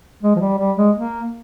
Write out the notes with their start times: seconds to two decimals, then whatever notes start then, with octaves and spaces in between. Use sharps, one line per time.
0.23 G#3
0.36 F3
0.40 G3
0.58 G3
0.77 G#3
0.96 A#3